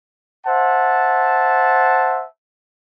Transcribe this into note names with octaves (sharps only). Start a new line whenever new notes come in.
C5 E5 F#5 A5